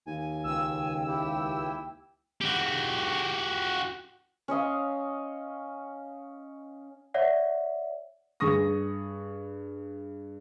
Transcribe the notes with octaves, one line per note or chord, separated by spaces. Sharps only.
D#2 G#5
C#2 G5 E6
E4 G4
F#4 G4
C#4 C#5 D#5 F5
C#5 D5 E5 F#5
G2 G#4 C#6 D#6 A#6